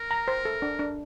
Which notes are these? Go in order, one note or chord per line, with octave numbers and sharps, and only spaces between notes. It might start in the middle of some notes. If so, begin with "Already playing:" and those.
Already playing: A#4
A#5
C5
A4
D4
D4